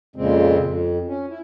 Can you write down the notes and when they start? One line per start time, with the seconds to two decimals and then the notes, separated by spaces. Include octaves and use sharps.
0.16 F2 A#2 C#3 G#3 C4
0.61 F2
1.08 C#4
1.30 E4